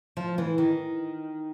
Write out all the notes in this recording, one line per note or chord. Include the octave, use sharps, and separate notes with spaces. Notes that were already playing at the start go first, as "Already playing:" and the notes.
F3
E3
D#3